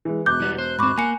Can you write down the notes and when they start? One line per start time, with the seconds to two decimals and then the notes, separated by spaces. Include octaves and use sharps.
0.05 E3 G#3
0.26 E1 D6 F#6 G6
0.40 E3 G3 B3
0.58 C5 F#6
0.79 G#2 C4 B5 C#6 D6
0.98 A#3 G#5 C#7